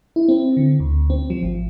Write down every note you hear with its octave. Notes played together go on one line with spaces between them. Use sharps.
E4
C4
D3
D2
C4
F3
G#1